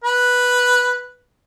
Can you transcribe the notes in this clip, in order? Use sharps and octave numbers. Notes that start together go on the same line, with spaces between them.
B4